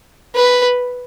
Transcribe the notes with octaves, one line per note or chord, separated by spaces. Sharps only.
B4